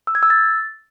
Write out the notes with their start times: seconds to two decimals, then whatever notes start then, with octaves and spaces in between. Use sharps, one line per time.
0.07 E6
0.15 G#6
0.23 E6
0.30 A6